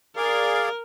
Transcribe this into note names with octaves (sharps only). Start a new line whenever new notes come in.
G#4 A#4 D5 F5